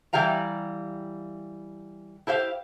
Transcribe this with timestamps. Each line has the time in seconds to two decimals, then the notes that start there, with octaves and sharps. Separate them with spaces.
0.13 E3 G3 G4 F5 A#5
2.27 E4 G4 C5 F5